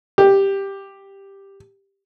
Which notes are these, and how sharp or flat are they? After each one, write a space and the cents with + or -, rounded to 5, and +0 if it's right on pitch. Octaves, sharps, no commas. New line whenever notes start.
G4 +5